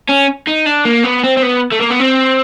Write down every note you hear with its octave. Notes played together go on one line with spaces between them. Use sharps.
C#4
D#4
D4
A#3
B3
C4
C4
B3
A3
A#3
B3
C4